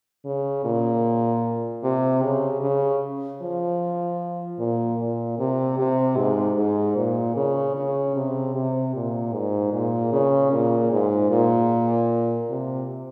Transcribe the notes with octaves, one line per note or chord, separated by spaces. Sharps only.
C#3
A#2
C3
C#3
C#3
F3
A#2
A#2
C3
C3
G#2
G#2
A#2
C#3
C#3
C3
C3
A#2
G#2
A#2
C#3
A#2
G#2
A#2
C3